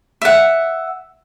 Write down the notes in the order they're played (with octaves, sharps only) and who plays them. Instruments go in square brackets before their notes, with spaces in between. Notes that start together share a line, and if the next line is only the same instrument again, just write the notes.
[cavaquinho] E5 F#5